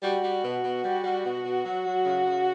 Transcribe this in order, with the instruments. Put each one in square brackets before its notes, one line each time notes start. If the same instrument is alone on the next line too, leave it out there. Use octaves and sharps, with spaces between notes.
[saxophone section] G3 F#4
G3
B2
B2
G3
G3
B2
B2
F#3
F#3
C#3
C#3